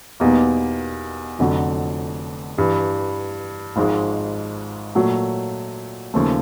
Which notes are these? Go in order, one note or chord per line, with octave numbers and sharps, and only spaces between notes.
E2 B2 G3 A#3 D#4
F1 F2 D3 F#3
G2 E3 G3
G#1 G#2 F3 G#3
A#2 F#3 A3
D#2 C#3 F3 A3